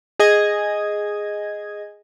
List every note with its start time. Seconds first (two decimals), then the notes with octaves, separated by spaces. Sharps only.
0.19 G#4 D#5 G#6